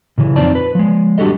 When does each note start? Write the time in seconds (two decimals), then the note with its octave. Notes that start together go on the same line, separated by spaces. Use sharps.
0.18 A#2 C#3 E3
0.36 F2 C4 D#4 F4 D5 A5
0.55 B4
0.75 F3 G#3
1.18 G3 D4 F#4 G4 A4 D#5